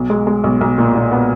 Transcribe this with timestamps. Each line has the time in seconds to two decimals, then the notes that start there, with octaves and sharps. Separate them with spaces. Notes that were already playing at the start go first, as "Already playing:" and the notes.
Already playing: B1
0.10 G#3
0.27 G#3
0.44 B1
0.61 B1
0.78 A#2
0.95 A#2
1.12 B3